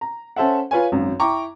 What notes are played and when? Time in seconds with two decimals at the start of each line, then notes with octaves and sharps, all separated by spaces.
0.01 A#5
0.36 C#4 A4 C5 E5 F#5
0.71 F4 B4 C#5 G#5
0.92 G#1 F#2
1.20 E4 G5 A#5 C#6 D6